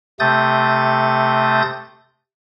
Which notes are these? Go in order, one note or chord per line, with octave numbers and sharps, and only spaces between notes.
C3 A3 D#6 G6 A6